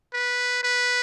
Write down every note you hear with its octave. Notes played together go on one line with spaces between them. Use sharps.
B4
B4